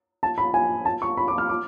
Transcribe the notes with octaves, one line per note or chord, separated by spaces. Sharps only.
A5
B5
G#5
A5
C#6
B5
D6
F6
D6